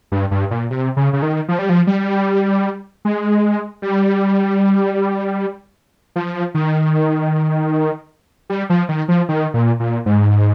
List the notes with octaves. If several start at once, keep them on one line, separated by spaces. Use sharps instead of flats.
G2
G2
A#2
C3
C#3
C#3
D#3
F3
G3
F3
G3
G#3
G3
F3
D#3
G3
F3
D#3
F3
D#3
A#2
A#2
G#2